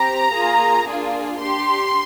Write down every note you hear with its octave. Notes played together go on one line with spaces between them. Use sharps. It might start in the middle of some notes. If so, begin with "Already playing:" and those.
Already playing: C4 G4 A#5
A#3 F4 G#4
A#3 D4 F4 G#4
D4 G4 C6